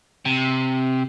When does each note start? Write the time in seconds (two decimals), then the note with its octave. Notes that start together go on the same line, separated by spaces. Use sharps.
0.25 C3